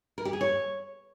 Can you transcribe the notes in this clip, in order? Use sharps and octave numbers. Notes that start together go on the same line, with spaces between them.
A#4
G4
G#4
C#5